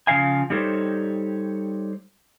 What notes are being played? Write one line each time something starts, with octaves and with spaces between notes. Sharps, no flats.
C#3 F3 F5 G#5
G3 D#4 G4 A4 C5 C#5